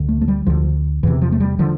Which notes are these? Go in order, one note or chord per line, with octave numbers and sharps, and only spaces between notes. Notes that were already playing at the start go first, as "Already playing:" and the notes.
Already playing: D2 D3
A3
A3
G3
D2 D3 F3
E2 C3 E3
F3
A3
G3
D3 F3